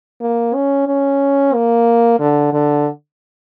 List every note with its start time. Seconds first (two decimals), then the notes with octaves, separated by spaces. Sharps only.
0.21 A#3
0.55 C#4
0.87 C#4
1.54 A#3
2.20 D3
2.53 D3